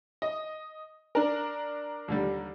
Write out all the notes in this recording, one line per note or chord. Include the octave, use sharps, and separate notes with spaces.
D#5
D4 A#4
D#2 D3 G3